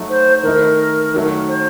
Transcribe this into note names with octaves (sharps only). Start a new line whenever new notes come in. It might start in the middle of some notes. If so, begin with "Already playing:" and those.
Already playing: F#3 A3 D#4
C5
D#3 A3 D#4 A#4
D#3 F#3 A3
C5